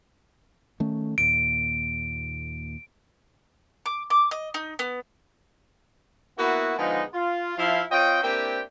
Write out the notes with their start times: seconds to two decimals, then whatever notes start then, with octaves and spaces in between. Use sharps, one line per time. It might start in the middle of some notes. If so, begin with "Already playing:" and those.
0.80 D#3 A3 C#4
1.18 D#2 A#2 D7
3.86 D6
4.10 D6
4.31 D#5
4.54 D#4
4.79 B3
6.38 A#3 B3 E4 F#4
6.78 D3 F3 G#3 B3 D#4
7.14 F4
7.57 F3 E4 F5
7.91 C4 F4 C#5 D#5 G5
8.23 A#3 C4 D4 E4 G4 G5